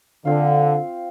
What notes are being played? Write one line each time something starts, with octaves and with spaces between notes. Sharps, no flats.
D3 C4 F4 C5 F5